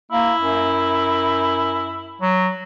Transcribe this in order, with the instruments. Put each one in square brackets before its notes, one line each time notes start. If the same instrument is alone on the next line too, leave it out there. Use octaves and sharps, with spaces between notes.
[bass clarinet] A#3 [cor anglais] E4
[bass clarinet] F#2
F#3